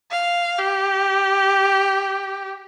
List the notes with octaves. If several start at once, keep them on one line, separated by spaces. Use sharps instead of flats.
F5
G4